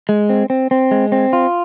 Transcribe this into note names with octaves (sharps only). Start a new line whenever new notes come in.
G#3
C4
C4
C4
G#3
C4
F4